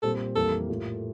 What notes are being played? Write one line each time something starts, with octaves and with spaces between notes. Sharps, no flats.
A#2 G3 C4 G4 A4
F2 E3 G3 A#3 A4
A2 G3 A#3 F4